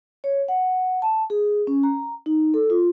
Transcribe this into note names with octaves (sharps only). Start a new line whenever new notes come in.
C#5
F#5
A5
G#4
C#4
A#5
D#4
A4
F4